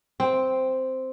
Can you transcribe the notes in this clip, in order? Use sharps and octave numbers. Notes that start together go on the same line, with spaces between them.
C4